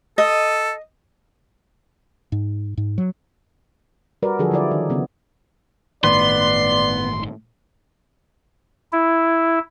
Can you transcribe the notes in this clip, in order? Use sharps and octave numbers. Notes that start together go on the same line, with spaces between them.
A4 D#5
G#2
G#2
F#3
G3 F#4 A#4 B4 D5
D3 F3 F#3 F#4 G#4 A4
D3 F#3 E4 D5
D#3 D#4
C#3 B3 D4
G1 A2 D#3 B3 B4 D5 C6
E4